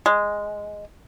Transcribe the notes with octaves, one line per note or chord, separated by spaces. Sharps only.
G#3